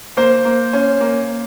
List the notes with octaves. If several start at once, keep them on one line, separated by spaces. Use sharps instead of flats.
A#3 C5
A#3
C#4
A#3